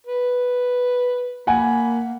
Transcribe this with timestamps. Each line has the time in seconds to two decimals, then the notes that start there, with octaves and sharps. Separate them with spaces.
0.07 B4
1.47 A#3 F#5 G#5 B5